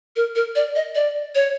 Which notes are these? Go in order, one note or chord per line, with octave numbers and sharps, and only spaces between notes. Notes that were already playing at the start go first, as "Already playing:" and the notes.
A#4
A#4
D5
D#5
D5
C#5